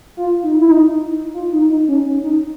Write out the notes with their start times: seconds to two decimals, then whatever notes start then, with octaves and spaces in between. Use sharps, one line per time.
0.17 F4
0.43 D#4
0.59 E4
0.71 D#4
1.34 F4
1.53 D#4
1.70 D#4
1.88 C#4
2.06 C#4
2.24 D#4